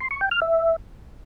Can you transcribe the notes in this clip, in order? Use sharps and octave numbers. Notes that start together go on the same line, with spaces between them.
C6
C#6
G5
F6
E5